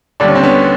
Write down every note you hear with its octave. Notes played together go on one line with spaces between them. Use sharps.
D#2 D3 G3 D4
C#4
C4
B3 C#4